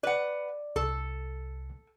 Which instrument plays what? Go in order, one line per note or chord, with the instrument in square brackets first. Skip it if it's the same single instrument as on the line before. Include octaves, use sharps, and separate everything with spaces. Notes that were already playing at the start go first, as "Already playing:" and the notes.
[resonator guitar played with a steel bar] B4 F#5 [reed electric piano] D5
[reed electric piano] C2 [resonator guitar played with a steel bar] A4